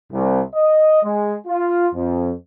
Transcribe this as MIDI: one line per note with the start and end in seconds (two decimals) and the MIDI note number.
0.12 0.41 36
0.54 1.03 75
1.03 1.34 56
1.47 1.87 65
1.95 2.31 41